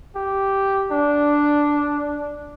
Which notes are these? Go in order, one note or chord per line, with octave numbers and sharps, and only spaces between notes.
G4
D4